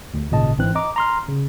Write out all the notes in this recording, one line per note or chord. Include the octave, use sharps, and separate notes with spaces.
D2
G#1 A#2 C#3 D#5 A5
G1 G#2 E3 C4 D4 F#6
D#5 A#5 D6
A#5 C6 F6
C#3